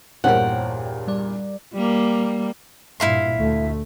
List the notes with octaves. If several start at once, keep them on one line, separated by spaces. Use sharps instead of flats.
E2 G2 A#2 A#4 C5 C#5 F#5 G5
G3 D5
G3 A#3
G2 A#2 E4 F5 C6
D2 A3